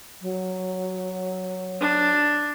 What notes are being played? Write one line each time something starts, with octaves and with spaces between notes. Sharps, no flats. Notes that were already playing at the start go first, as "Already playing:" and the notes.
F#3
D4